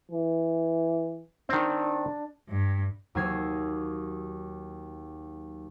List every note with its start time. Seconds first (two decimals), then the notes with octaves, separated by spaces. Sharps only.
0.11 E3
1.49 D#3 C4 D4
2.49 G2
3.15 D#2 F#3 D#6 E6 G#6 C7